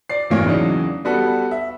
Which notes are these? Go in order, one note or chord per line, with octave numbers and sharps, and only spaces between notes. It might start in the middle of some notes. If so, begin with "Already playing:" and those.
D5 C7
G#1 B2 E3 A#3 C#5
E2 C#3 E3 F#3 D4 D#4
G3 B3 F#4 A4
E5